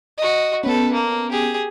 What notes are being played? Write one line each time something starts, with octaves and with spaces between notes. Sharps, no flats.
F#4 D#5
B3 C#4 A4 B4
A#3
G4 G#4